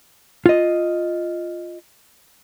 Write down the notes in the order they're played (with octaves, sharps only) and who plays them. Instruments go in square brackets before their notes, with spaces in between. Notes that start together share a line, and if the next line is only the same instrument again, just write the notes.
[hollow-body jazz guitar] F4 D#5